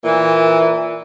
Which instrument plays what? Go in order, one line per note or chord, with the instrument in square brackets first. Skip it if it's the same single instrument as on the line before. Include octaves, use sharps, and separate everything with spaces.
[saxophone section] A#2 E3